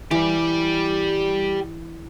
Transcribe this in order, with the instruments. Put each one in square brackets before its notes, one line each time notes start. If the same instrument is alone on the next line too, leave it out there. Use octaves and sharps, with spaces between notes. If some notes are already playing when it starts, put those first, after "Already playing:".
[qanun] E3 [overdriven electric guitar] G4 D5